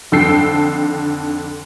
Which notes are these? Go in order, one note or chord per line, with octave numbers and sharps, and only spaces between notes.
F2 D3 D#3 A4 G5 C7